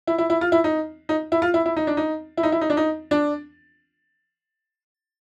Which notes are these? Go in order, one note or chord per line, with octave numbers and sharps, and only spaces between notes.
E4
E4
E4
F4
E4
D#4
D#4
E4
F4
E4
E4
D#4
D4
D#4
E4
D#4
E4
D#4
D4
D#4
D4